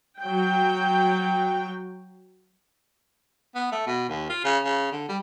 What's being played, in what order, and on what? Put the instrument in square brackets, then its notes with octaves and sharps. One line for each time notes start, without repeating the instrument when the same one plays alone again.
[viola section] F#3 G5
[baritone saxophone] B3
A3
B2
D#2
F4
C#3
C#3
D3
G3